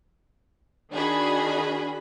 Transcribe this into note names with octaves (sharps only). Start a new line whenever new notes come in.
D#3 D4 F#4 G#4 B5